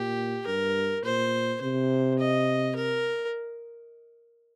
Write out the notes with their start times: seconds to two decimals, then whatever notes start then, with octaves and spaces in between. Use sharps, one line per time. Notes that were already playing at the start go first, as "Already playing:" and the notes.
Already playing: A#2 G4
0.46 G2 A#4
1.04 A#2 C5
1.61 C3 C5
2.19 D#5
2.76 A#4